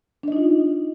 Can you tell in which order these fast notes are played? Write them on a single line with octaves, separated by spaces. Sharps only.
D4 D#5 D#4 F4